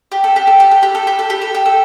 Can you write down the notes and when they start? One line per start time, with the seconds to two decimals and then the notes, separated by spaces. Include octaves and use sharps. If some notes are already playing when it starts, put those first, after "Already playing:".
0.12 G4
0.24 A4
0.36 G4
0.47 A4
0.60 G4
0.71 A4
0.83 G4
0.95 A4
1.07 G4
1.19 A4
1.30 G4
1.42 A4
1.55 G4
1.65 A4